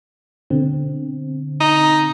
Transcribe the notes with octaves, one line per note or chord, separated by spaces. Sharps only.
B2 D3 C4
D#4